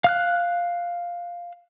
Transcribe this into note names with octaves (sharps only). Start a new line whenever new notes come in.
F5 F6 F#6